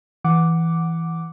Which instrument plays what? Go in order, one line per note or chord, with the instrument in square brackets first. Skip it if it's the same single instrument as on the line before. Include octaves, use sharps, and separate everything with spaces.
[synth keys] E3 F#5 D6